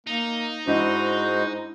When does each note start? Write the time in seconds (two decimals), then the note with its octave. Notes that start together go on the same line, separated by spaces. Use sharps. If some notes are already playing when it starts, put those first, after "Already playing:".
0.07 A#3 D#4
0.67 G#2 G#3 D4 E4 F#4 C5 D#5